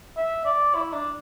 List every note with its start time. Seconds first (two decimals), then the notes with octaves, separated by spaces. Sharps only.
0.17 E5
0.45 D5
0.75 E4
0.93 D4